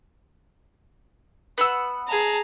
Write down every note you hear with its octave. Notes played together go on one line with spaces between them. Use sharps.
B3 F#5 E6
G#4 A5 A#5